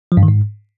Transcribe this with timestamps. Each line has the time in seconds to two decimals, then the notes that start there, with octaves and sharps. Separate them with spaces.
0.12 F3
0.17 G2
0.23 D#3
0.28 G#2